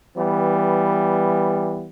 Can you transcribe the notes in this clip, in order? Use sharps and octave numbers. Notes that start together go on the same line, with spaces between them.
E3 G3 B3